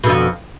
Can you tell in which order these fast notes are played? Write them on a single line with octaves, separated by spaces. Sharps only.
B2 D3 F2